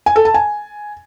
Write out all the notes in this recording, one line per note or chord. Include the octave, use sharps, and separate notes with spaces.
G#5
A4
A5
G#5